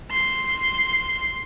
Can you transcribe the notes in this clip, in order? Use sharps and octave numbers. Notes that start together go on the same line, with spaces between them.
C6